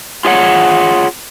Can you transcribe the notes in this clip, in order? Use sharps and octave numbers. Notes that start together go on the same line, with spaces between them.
F4 G#4 C#5 F#5